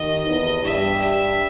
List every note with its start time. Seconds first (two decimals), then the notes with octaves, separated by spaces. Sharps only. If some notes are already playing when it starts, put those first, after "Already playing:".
Already playing: D#2 D#3 D#5
0.26 E2 E3
0.64 G2 G3 E5
1.01 E5